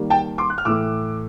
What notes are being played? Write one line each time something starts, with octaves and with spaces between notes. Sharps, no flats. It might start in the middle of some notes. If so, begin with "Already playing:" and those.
Already playing: D#3 G3 A#3
G5 A5
C6 D6
F#6
F6
A2 E3 A3 D6 E6